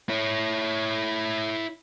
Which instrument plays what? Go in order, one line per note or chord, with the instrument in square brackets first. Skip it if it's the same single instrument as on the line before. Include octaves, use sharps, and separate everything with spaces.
[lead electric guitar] E4 C#5